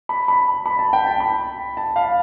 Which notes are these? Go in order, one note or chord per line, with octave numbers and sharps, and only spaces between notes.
B5
B5
B5
A5
G5
A5
B5
A5
F5